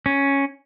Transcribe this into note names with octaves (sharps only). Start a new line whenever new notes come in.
C#4